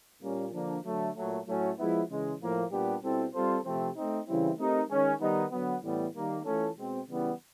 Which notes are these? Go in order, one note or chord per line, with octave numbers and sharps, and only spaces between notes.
A#2 G3 A#3 C#4
D3 F3 A#3 D4
D3 F#3 A3
A#2 F#3 A3
A2 F#3 A3 C#4 F#4
F3 G#3 B3 E4
C#3 E3 G#3
A2 F3 A#3
A#2 G3 B3 D4 G4
B2 G3 C4 E4 A4
G3 C4 F4 A4 C5
C3 F3 A3 C4
A3 C4 D#4
C#3 E3 G3 C4 E4
A3 C4 D#4 G4 A#4
D#3 G#3 C#4
D#3 G3 B3 D#4
D3 F#3 B3
A2 E3 G3 B3
D#3 G3 A#3
E3 A3 C#4 F4 A4
B2 G#3 C4
C#3 E3 G3 B3 E4